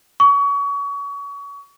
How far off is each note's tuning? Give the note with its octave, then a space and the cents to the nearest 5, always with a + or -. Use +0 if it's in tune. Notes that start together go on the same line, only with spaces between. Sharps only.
C#6 +30